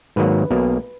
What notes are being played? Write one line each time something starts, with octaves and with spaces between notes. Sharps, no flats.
G#2 D#3 F#3 A#3 B4
B1 B2 A#3